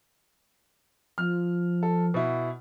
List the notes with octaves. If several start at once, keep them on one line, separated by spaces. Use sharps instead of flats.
F3 F6
A4
B2 E4